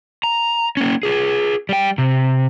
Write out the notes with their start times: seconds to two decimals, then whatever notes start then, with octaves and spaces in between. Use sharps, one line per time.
0.24 A#5
0.77 A#3 C#4
1.03 F4 G#4
1.69 G3 G5
1.98 C3